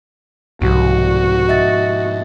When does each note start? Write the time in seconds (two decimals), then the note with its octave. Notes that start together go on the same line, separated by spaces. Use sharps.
0.62 C2 G#2 B2 F3 F#4
1.49 D#5 E5 A6